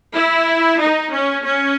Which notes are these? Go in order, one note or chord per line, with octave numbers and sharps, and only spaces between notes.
E4
D#4
C#4
C#4